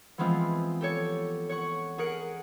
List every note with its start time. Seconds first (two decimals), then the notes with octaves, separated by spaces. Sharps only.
0.18 E3 F3 G#3 B3 C4 F4
0.81 G4 A4 C#5
1.49 C#5 F#5 C#6
1.98 G#4 A#4 F#5 D7